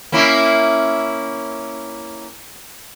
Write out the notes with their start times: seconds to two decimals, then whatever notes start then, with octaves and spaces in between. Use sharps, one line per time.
0.12 A#3 C#4 E4